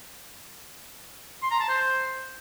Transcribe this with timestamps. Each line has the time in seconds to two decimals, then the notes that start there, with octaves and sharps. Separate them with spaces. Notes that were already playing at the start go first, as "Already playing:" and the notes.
1.42 C6
1.51 A#5
1.60 A5
1.69 C5